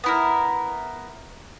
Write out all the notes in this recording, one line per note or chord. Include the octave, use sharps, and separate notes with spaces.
B3 E4 A#4